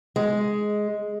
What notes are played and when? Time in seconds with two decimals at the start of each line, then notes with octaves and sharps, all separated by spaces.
0.16 G#3